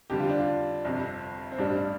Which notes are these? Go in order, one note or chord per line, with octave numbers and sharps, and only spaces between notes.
F2 D3 G3 G4
F4
D4
F4
G1 F2 C3
C4
A1 G2 G3 D4